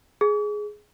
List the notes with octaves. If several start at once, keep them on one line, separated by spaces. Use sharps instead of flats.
G#4